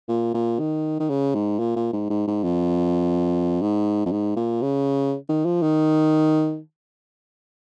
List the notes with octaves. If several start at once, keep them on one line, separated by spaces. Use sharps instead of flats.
A#2
A#2
D#3
D#3
C#3
G#2
A#2
A#2
G#2
G#2
G#2
F2
G#2
F2
G#2
A#2
C#3
D#3
F3
D#3